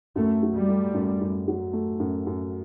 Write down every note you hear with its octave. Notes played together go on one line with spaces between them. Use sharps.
F#2 A3
F#3
G3
A3
F#2
F#2
F#3
A3
F#2
F#2